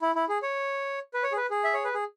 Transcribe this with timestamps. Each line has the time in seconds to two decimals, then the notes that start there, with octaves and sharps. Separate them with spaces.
0.02 E4
0.15 E4
0.29 G#4
0.43 C#5
1.14 B4
1.23 C#5
1.32 G#4
1.37 B4
1.51 G#4
1.64 E5
1.74 C#5
1.84 B4
1.94 G#4